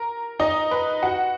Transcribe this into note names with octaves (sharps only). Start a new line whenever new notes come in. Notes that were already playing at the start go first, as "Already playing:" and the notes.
Already playing: A#4 A#5
D#4 D#5
B4
F#4 F#5